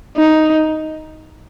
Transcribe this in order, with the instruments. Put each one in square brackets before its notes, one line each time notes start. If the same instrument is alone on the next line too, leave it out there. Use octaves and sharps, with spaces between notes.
[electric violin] D#4